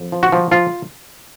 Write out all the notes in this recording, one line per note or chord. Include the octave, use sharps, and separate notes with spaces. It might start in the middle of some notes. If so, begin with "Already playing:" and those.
Already playing: F2
F3
F#4
F3
F3 F4